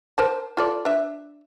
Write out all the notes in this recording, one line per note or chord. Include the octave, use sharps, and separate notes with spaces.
A#4 C5 A5
F4 A4 D5
D4 E5